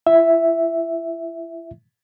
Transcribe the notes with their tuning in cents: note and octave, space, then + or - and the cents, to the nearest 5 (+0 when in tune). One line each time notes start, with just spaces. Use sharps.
E4 +35 E5 +0